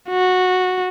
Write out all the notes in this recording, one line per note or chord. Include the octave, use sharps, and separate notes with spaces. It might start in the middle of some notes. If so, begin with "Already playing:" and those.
F#4